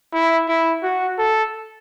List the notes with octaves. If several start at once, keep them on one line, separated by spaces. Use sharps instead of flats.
E4
E4
F#4
A4